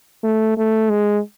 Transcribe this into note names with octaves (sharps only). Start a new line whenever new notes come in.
A3
A3
G#3